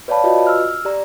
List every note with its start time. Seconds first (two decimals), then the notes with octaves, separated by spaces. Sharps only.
0.08 B4 C#5 D5 F5 A5 B5
0.24 F4 F#4 B4 D#5
0.47 E6 F6
0.85 G4 D5 A#5